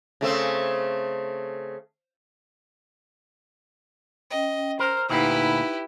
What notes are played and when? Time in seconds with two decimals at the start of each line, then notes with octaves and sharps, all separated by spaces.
0.21 C#3 A3 C4
4.31 C#4 D#5 G5
4.80 A#4 C5
5.10 D2 A#2 D#4 E4 G4 B4 F#5